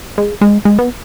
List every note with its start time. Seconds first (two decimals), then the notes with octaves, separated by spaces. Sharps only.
0.18 G#3
0.41 G#3
0.65 G#3
0.79 B3